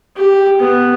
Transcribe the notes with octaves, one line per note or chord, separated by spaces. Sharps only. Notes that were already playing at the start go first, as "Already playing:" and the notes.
G4
B3